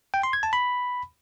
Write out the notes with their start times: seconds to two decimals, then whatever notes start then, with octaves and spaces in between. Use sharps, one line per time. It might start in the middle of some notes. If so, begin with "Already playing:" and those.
0.14 G5
0.23 C6
0.33 G#6
0.43 A5
0.53 B5